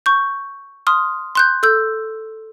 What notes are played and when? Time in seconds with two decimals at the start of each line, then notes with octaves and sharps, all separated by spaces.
0.06 C#6 G6
0.87 C6 D#6 F6
1.35 C6 F#6 G6
1.63 A4 E6 G6